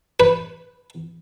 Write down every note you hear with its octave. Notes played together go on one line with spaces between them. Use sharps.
B4